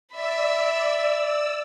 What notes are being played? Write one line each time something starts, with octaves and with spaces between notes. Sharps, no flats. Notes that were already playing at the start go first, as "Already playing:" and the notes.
D5 E5 B5 E6